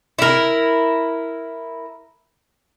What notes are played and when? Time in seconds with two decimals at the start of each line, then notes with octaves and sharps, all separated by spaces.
0.19 E4 A#4